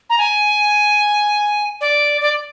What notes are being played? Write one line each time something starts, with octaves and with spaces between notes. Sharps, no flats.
A#5
G#5
D5
D5